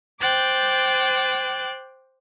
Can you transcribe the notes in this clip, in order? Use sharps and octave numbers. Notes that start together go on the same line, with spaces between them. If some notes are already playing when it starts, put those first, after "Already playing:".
C5 G5 D6 F#6 A6